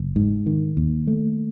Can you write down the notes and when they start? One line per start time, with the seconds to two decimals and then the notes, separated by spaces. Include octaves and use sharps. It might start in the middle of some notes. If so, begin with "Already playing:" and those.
Already playing: F#1
0.16 G#2
0.46 D#3
0.77 D#2
1.07 A3